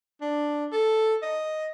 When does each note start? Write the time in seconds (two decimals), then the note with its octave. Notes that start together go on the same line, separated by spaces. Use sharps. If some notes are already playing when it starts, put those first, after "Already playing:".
0.21 D4
0.72 A4
1.22 D#5